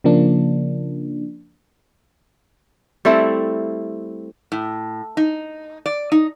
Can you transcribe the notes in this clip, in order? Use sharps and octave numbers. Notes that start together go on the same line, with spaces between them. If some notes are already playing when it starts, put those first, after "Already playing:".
C#3 F3 A#3 D4
G3 A3 C4 E4
A2
D#4
D5
D#4